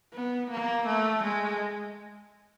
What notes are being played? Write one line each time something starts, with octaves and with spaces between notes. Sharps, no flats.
B3
A#3
A3
G#3